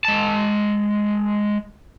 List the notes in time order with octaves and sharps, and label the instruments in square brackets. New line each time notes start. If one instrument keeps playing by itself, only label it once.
[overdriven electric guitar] G#3 A5